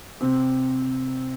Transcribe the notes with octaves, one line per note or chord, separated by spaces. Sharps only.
C3 C4